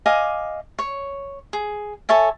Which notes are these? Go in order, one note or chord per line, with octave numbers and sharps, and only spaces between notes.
D#5 F5 G#5 D6
C#5
G#4
A4 C#5 E5 G#5